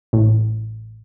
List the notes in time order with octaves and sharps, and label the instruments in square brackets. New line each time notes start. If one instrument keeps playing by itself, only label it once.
[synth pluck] A1